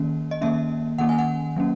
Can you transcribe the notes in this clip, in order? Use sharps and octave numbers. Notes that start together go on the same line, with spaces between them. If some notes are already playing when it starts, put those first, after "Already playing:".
Already playing: D#3 A#3 C#4
D#5
D#3 A#3 C#4 E5
D#3 A#3 C#4 F#5
G#5
F#5
F#3 A#3 C#4